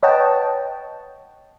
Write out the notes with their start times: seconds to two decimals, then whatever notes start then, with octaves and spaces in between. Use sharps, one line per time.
0.02 B4 C#5 D#5 F#5 G5 A5